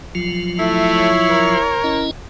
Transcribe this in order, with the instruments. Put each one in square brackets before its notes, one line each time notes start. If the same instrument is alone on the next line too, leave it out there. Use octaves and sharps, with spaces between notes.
[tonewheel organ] F3 F#3 F4
[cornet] A3 [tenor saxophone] E4
[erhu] C#5
[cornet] A#4
[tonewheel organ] C#4 E4 D#5